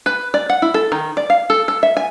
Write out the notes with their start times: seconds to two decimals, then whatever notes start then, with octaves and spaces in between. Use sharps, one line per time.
0.06 B4
0.34 D5
0.50 F#5
0.62 E4
0.74 A4
0.92 D#3
1.17 D5
1.30 F5
1.50 A4
1.68 A4
1.83 E5
1.97 G#5